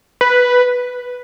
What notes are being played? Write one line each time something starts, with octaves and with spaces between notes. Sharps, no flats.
B4